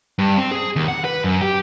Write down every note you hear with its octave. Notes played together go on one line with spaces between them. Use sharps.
G2
C4
G#4
D#2
F#5
B4
F#2
G4